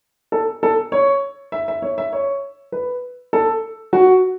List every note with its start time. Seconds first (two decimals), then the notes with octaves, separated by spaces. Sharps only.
0.32 A4
0.63 A4
0.92 C#5
1.52 E5
1.68 E5
1.82 C#5
1.98 E5
2.13 C#5
2.72 B4
3.33 A4
3.93 F#4